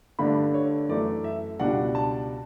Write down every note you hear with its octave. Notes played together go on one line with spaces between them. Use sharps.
G2 D3 A3 D4 B5
C#5
F#2 E3 A3 D5
E5
C#2 B2 G3 D4 F#5
A5